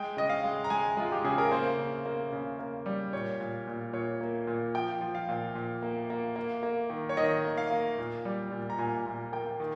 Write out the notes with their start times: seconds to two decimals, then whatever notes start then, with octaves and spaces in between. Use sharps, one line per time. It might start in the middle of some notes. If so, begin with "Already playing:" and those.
Already playing: G#3 G5
0.17 C#3 D#5
0.29 F5
0.44 G#3
0.64 A#5
0.70 G#3 G#5
0.97 G#3 F4
1.12 G4
1.24 C#3 G#4
1.38 A#4
1.51 A#3 C5
1.78 C#3
2.06 A#3
2.32 C#3
2.59 A#3
2.86 G3
3.13 A#2 C#5
3.40 A#2
3.67 A#2
3.93 A#2 C#5
4.21 A#3
4.47 A#2
4.75 F3 G5
5.01 F3
5.15 F5
5.29 A#2
5.55 A#2
5.83 A#3
6.10 A#3
6.36 A#3
6.63 A#3
6.90 D#3
7.09 C#5
7.17 D#3 D#5
7.45 A#3
7.58 F5
7.71 A#3
7.98 A#2
8.25 G3
8.51 A#2
8.70 A#5
8.78 A#2 G#5
9.06 A#2
9.32 A#3 G5
9.60 D#3